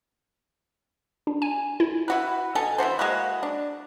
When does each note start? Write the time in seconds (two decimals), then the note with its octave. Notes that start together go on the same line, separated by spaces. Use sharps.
1.27 D4
1.42 G#5
1.80 E4
2.08 E4 F#4 B4
2.55 B2 A4 G#5
2.78 E3 E4 F#4 C5
2.99 G#3 A#3 E4 F#4
3.43 D4